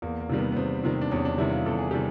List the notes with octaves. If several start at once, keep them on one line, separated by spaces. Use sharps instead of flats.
E2 A#3
A#3
C3 D#3 G3
B3
B3
E2 C4
C3 D#3 G3
D4
E2 C#4
D4
C3 D#3 G3 E4
F4
E2 A4
G#4
C3 D#3 G3 G4